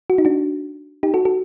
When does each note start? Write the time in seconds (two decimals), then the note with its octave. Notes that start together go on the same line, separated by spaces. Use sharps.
0.10 F#4
0.18 D#4
0.25 D4 F#4
1.03 D#4 G4
1.14 F#4 A4
1.25 F#4 A4